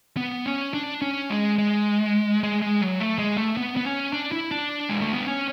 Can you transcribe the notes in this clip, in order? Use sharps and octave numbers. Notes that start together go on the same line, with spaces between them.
B3
C#4
D4
C#4
G#3
G#3
G#3
G#3
F#3
A3
G#3
A3
B3
B3
C#4
D4
E4
D4
G#3
A3
B3
C#4